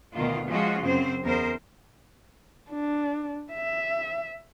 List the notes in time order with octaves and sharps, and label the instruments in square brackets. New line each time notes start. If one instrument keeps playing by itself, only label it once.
[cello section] D2 B2 D#3 F4
F3 G#3 C#4 F4 F#4
F#2 C#3 C4 C5
E2 B3 A#4 C5
[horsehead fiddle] D4
E5